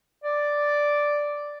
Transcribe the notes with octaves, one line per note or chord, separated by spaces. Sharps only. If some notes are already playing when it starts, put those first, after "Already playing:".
D5